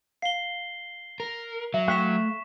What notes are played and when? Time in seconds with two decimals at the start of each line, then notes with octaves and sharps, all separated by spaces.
0.22 F5 C7 G7
1.20 A#4
1.74 F#3 E5
1.88 A3 F5 G5 C#6 F#6 B6 E7